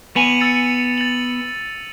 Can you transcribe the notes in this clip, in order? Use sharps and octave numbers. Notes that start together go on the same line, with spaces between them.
B3 G#5 D#7 F7 F#7
E6 A6 C#7
A6 F#7